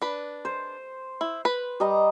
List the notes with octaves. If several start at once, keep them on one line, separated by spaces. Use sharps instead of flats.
D4 B4
C5
E4
B4
G3 D#5 A#5